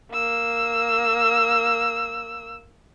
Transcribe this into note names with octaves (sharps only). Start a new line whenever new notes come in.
A#3 E6